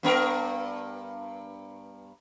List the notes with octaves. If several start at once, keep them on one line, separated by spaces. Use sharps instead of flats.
G2 B3 A#4